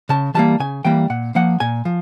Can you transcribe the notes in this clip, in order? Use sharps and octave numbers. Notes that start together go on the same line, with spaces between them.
C#3 A5
E3 G3 A#3 A5
C#3 G#5
E3 G3 A#3 G5
A#2 F#5
F3 A#3 F#5
A#2 G#5
F3